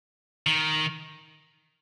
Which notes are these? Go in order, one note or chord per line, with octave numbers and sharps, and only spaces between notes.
D#3